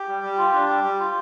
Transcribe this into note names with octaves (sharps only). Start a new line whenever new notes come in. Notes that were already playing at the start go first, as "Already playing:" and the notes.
Already playing: G4
G3
G3
F4
D4
G3
G3
F4